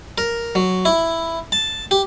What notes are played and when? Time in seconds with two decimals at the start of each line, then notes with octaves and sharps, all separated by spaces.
0.18 A#4
0.55 F#3
0.85 E4
1.52 A5
1.91 G4